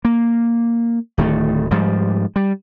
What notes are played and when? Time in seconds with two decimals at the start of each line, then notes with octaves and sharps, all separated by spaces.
0.05 A#3
1.18 D1 D#3 A3
1.71 G#2 F3 G3
2.36 G3